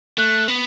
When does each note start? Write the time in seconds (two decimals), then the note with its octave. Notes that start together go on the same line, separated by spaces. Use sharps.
0.18 A3 F#6
0.48 B3